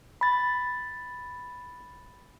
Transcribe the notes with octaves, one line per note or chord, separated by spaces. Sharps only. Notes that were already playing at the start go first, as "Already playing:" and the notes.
B5 A6